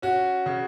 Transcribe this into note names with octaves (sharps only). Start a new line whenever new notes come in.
C#4 F#4
C#3